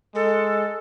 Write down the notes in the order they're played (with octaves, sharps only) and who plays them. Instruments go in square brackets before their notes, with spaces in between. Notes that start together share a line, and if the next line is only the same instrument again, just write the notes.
[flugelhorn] G#3 [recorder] A4